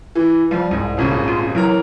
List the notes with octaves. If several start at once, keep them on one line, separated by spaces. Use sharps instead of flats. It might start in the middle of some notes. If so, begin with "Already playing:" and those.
E3
F3 G3
C2 G#2
D#1 G#1 C#3
F4
E3 F#3 A#4 A#5